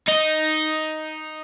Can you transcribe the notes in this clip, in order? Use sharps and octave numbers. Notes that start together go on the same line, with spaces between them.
D#4